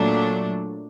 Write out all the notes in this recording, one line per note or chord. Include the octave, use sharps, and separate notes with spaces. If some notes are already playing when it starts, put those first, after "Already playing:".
Already playing: A#2 F#3 A3 D4